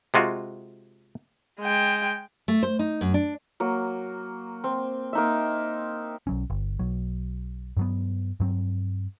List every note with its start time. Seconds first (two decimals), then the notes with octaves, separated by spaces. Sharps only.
0.14 C3 G#3 F4 F#4
1.60 G#3 G5
2.48 A3
2.63 C5
2.79 D#4
3.01 F#2
3.14 D4
3.60 F#3 A#3
4.64 C4
5.13 A#3 D#4 E5
6.27 B1 F#3 C#4
6.50 G1
6.79 B1 F#3
7.77 G2 F#3 B3
8.40 G2 F#3 C4